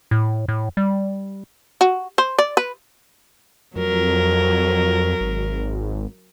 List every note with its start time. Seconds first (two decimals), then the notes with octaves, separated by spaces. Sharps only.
0.11 A2
0.48 A2
0.77 G3
1.81 F#4
2.18 C5
2.39 D5
2.57 B4
3.76 F2 F#3 A#4
5.21 G#1